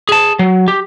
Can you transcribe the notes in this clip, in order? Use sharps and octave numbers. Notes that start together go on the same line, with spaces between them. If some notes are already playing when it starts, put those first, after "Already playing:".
G#4 A5
F#3
G4